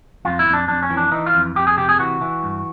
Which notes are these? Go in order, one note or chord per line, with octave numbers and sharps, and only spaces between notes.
F2 F4
E4
F2
D4
F2 D4
C#4
E3
D4
E3 D#4
F4
F2
F2 G4
G#4
C3 G4
G#4
E3 F#4
E3
G2